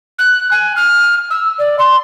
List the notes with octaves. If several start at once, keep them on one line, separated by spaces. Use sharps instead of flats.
F#6
G#5
F6
E6
D5
C6